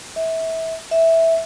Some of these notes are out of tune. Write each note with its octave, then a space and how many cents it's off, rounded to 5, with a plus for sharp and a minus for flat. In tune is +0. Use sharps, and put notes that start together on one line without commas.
E5 -25
E5 -5